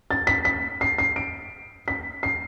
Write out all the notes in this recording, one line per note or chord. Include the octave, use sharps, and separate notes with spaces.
A6
B6
B6
C7
C7
D7
B6
C7